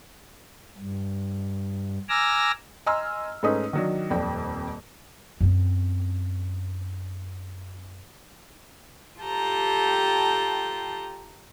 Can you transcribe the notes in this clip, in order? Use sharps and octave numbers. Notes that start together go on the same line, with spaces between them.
G2
G#5 A#5 D6 E6 F6 A#6
D#5 G#5 A#5 C6 E6 F6
G#2 A3 C#4 D#4 B4 D#6
D#3 F#3 D4
D#1 F2 D5 G5
F#2 C4
F4 G4 A4 G5 A5 A#5